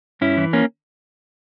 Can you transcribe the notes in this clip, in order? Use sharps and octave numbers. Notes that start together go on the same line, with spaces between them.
G2 C#4 E4
E3
A#3 C#4